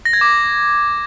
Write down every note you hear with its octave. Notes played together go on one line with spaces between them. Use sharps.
A#6
G#6
D6